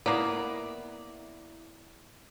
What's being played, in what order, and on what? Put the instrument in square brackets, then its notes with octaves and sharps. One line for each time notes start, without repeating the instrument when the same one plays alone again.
[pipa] A#3 B3 [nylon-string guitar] E4 D5